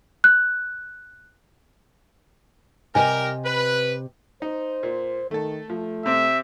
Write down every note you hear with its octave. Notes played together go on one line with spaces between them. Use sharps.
F#6
C3 G3 G4 A#4 D#5 G#5
B4
D#4 C5
A#2
D#3 A3 A4
F3 A3
C3 C4 E5